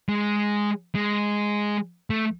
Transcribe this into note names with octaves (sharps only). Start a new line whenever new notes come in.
G#3
G#3
A3